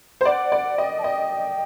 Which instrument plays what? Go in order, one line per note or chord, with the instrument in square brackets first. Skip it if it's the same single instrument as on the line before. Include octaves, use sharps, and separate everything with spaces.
[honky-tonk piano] C5
[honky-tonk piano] D5 [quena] F#5
[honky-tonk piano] D5
[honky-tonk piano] D#5 [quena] G5
[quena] A5
[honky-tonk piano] D#5 [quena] G5